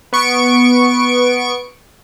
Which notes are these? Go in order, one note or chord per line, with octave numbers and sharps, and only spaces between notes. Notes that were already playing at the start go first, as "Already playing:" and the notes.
B3 C#6 D7